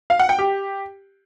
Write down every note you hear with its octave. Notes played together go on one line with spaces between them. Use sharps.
F5
F#5
G5
G4